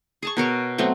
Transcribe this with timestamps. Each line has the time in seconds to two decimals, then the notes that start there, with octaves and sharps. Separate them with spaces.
0.23 G#4 A5 C#6
0.37 B2 A#4 C#5 A5
0.78 F#3 A3 B3 C4